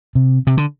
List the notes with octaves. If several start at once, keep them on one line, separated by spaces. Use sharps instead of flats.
C3
C3
D3